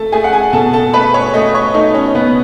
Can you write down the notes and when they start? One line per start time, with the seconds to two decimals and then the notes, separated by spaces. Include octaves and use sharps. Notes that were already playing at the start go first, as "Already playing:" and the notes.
Already playing: A3 A4 A5
0.12 A3 G#4 G#5
0.24 F#5
0.33 G#4 G#5
0.53 B2 A4 A5
0.73 A4 A5
0.93 A3 B4 B5
1.14 C#5 C#6
1.34 A3 D#5 D#6
1.54 C#5 C#6
1.74 A3 D#4 D#5
1.94 C#4 C#5
2.14 B2 B3 B4